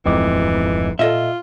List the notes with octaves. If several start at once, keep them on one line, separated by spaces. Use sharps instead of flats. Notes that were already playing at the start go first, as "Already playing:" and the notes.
D1 F2 G#2 E3 C4 D#5 D6
A#2 F4 A4 D#5 E5